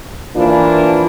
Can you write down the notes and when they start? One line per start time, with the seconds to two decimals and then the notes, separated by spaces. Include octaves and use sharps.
0.36 E3 F3 A#3 D4 F4